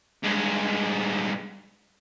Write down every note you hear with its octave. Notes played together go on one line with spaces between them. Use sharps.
G2 G#3